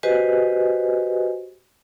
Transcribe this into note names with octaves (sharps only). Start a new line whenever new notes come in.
F#4 G4 B4 C5 D#5 G#5